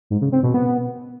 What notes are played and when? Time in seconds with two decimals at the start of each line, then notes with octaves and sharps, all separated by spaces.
0.10 G#2
0.21 C#3
0.32 C4
0.43 B2
0.54 B3